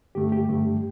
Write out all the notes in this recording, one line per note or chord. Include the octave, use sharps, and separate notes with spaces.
G2 D3 A3 G4
G4
G2 D3 A3